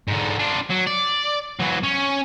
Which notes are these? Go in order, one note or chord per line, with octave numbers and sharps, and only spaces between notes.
G#2 D3
D4 F4
F#3
D5
E3 F#3
C#4